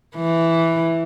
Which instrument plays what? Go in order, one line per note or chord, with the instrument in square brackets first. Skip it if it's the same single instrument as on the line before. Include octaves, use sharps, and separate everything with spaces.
[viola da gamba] E3